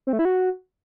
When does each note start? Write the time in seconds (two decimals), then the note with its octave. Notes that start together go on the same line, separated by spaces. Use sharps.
0.07 C4
0.13 A3
0.19 E4
0.25 F#4